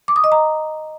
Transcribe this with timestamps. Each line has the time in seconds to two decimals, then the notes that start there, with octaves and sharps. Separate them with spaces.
0.08 D6
0.16 D#6
0.24 D#5
0.32 A#5